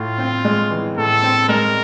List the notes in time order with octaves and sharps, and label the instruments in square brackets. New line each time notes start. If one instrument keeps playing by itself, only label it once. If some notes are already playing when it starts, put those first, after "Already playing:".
Already playing: [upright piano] A2 [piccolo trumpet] F4
[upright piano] C4
G#3
E3
[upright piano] A2 [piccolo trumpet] A4
[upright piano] C4
[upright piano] G#3 [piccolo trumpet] A#4